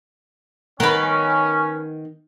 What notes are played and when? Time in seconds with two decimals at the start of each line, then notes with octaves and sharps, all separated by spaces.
0.80 D#3 B3 C#4 A#4 B4